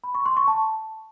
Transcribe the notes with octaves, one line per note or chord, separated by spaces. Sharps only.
B5
C#6
C6
C#6
A5